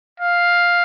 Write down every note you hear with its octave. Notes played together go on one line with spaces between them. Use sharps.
F5